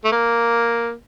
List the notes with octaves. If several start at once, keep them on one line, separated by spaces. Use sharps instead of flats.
A3
A#3